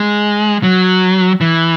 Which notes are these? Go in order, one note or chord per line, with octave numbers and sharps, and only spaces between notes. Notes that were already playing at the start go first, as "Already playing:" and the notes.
Already playing: G#3
F#3
E3